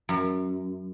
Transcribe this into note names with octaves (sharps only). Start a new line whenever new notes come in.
F#2